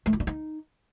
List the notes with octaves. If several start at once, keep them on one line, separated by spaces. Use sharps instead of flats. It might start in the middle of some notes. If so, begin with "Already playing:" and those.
A3
E4
D4
D#4